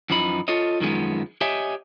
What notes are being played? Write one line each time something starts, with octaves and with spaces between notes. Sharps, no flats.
F#2 E3 F3 D#4 B5
F4 A4 C#5 D#5
F#2 D#3 F3 G#3 B3
G4 C#5 D#5 E5 G#5